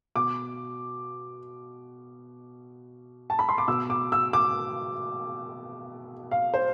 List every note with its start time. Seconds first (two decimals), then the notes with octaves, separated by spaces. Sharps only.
0.16 B2 D6
3.30 A5
3.39 B5
3.49 C6
3.58 D6
3.68 B2 E6
3.90 D6
4.12 E6
4.33 D6
6.31 F5
6.54 C5